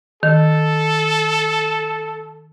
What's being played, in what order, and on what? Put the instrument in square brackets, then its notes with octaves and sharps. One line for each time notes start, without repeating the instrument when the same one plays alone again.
[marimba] D#3 [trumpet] A4